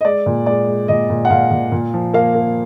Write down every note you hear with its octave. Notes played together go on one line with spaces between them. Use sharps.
D#5
G#3 D5
A#2
G#3 D5
G#3
A#2 D#5
A#2
F#5
A#2 F5
A#2
A#2
F3
A#3 F5
A#3